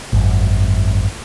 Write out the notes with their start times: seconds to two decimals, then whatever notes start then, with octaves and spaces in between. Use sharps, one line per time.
0.13 G#1 F#2